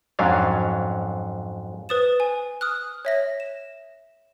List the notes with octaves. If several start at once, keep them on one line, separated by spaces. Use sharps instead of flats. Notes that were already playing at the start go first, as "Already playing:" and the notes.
F2 G#2 F#3 C#4 D4 F5
B4 C5 D#6 A6 E7
G#5
D#6 F6 F#6
C#5 E5 A#6
E7